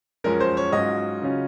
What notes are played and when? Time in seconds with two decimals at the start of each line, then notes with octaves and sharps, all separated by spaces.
0.24 F#2 F3 G#3 C#4 A#4
0.40 C5
0.57 C#5
0.72 G#2 F#3 C#4 F4 D#5
1.22 C#3 F#3 C#4 F4